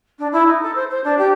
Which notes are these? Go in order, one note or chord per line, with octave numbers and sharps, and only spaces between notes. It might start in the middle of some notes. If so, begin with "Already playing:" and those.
D4
E4
D#4
A4
C5
C5
D4
G4